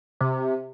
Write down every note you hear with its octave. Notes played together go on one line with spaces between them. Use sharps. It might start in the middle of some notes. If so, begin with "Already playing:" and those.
C3